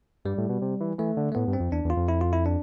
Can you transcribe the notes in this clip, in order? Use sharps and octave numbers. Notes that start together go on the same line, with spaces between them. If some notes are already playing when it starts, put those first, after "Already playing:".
G2 G3
A2
B2
C3
E3
E3 A3
D3
A3
A2 B3
G2
C4
F2
E2 D4
E2
F4
F2
E4
F4
E4
D4